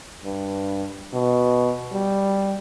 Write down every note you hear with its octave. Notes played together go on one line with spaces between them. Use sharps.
G2
B2
G3